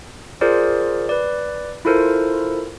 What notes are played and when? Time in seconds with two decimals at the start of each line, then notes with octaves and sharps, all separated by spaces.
0.41 F4 G#4 A#4 C5 D5
1.09 B4 D5
1.85 E4 F4 A4 A#4 C5